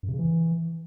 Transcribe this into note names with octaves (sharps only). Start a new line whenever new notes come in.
F#2
C3
C#3
E3